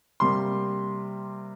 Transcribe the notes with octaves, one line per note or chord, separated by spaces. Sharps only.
C3 G3 A#3 C6